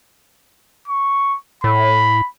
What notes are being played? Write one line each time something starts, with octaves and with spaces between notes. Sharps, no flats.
C#6
A2 B5